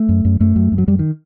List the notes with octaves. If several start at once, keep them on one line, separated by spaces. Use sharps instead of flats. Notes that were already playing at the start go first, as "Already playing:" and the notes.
Already playing: A3
F#2
F#2
F#2 A3
F#2
F#2
F#3
F#2 G3
D#3